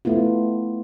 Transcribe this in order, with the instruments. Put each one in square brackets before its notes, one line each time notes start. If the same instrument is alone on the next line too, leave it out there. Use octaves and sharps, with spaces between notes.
[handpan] A3 B3 E4 F4